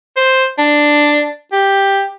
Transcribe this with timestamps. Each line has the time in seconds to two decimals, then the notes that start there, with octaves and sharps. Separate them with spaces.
0.17 C5
0.58 D4
1.52 G4